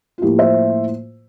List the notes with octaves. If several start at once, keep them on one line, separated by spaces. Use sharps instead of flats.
F4
A2 F3 A#3 E4 G4
C5 E5